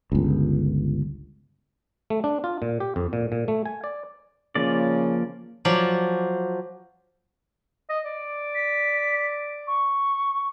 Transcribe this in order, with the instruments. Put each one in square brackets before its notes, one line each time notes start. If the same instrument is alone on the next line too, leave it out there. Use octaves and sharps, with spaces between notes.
[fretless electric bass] G1 C#2
[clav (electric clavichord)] A3
D4
F4
A#2
G4
F2
A#2
A#2
A3
G#5
D5
[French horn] C#3 [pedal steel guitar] F3 A#3 D5
[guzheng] F3 F#3 D5
[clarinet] D#5
D5
[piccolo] B6
C#6